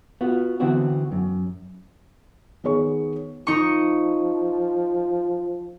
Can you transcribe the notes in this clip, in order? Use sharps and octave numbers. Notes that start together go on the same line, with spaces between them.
B3 F4 F#4
D3 E3 B3 C4 F#4
F#2
D#3 B3 G#4 C#5 C#6
F3 D#4 C#6